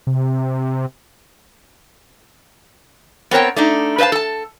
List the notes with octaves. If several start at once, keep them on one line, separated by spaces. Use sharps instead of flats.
C3
B3 C4 A#4 C#5 G5
A3 D4 D#4
B4 C5 D#5 F5 A5
A4 A5